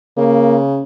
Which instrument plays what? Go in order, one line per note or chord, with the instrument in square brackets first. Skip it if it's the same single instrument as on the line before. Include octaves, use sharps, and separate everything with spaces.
[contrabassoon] C#3 [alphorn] A#3